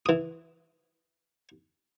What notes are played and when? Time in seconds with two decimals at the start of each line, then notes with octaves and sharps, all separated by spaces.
0.06 E3 D#6